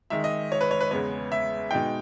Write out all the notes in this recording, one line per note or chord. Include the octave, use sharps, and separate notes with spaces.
D#3 G#3 D#4 E5
D#5
C#5
B4
C#5
B4
E2 C#3 G#3 B3 C#5
E5
B2 G#3 D#4 G5